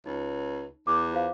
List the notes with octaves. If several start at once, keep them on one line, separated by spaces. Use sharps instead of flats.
C#2 D#4
E2 D6
F4 C5 F5